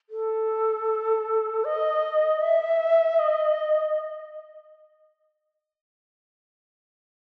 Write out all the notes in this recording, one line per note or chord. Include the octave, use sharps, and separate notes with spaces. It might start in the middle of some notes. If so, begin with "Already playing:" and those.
A4
D#5
E5
D#5